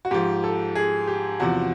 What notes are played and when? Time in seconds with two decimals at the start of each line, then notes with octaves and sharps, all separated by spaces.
0.05 F#4
0.11 G#2 F3 G4
0.44 A4
0.75 G#4
1.07 G4
1.40 E2 C3 F3 F#4